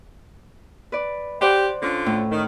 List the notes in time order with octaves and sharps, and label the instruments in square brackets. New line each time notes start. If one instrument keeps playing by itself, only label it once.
[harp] B4 D5
[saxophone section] G4 [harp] C5 D5 F#5
[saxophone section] D3 F4 [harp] C#4
[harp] A2
[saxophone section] D#3